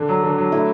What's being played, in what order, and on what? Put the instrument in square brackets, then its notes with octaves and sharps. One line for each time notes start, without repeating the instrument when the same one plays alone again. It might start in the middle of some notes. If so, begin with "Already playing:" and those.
Already playing: [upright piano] D3 [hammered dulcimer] D4
[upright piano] F#3
D3
F#3
[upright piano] A3 [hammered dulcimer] E4